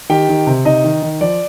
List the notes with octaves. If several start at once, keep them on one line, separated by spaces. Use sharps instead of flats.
D#3 G4 G5
D#3
C3
C3 D#4 D#5
D#3
D#3
F3 D5